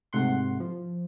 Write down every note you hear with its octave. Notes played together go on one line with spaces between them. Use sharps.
G#2 C3 A3 F#5 C6
F3